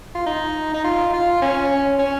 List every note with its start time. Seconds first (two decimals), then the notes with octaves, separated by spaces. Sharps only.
0.15 F4
0.26 D#4
0.74 D#4
0.84 F4
1.13 F4
1.42 C#4
1.99 C#4